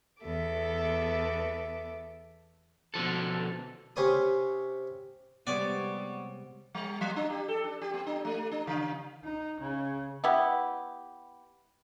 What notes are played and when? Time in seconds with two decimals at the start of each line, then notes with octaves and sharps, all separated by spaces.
0.23 E2 B3 A4 E5 D6
2.94 B2 D3 F3 A4
3.96 C3 C#4 C5 C#5 B5 D#6
5.47 C3 G3 G#3 B3 C#5 D5
6.75 G3
7.01 F#3
7.16 D4
7.30 G4
7.48 A4
7.64 D4
7.81 G4
7.94 B3
8.06 D4
8.25 A3
8.51 D4
8.67 C#3
9.24 D#4
9.60 C#3
10.24 B3 E4 G4